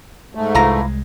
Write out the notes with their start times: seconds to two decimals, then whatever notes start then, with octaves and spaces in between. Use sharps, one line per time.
0.35 G#2 A3
0.55 C2 E3 G#3 F4 A#5